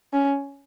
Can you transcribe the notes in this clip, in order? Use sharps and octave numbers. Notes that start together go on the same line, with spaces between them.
C#4